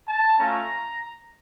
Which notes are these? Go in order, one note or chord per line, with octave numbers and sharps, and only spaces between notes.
A5
A3 C#4 F4 A#5